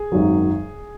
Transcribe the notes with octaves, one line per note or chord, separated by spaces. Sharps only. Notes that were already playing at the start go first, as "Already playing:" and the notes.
Already playing: G#4
G#1 F#2 D#3 F#3